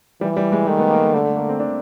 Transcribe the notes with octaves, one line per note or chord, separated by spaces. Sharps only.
E3 G3
G3
G#3
D#3 A3
B3
A#3
A3
D3 A3
A3
A#3
C4
D4